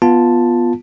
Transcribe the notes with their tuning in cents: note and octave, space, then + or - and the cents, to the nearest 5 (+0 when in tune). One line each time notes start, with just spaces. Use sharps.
B3 -10 F4 +0 A5 +0